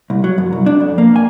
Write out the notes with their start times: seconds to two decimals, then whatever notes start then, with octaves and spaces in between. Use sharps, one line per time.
0.10 C2
0.24 F#3
0.38 F#2
0.53 C2
0.66 D4
0.81 F2
0.98 A#3
1.16 G#5